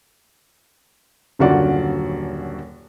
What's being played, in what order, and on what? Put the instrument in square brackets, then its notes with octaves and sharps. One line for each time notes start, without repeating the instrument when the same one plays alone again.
[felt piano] D#1 F#2 D3 F4 F#4 D5